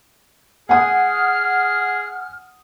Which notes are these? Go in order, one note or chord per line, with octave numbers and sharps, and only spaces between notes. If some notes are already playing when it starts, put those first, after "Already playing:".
G#4 F#5 G#5 D#6 F6